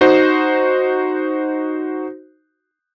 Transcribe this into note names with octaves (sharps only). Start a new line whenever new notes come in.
D#4 F#4 C5